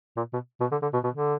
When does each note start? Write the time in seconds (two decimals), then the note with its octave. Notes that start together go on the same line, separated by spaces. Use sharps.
0.17 A#2
0.33 B2
0.61 B2
0.71 D3
0.82 D3
0.93 B2
1.04 B2
1.15 D3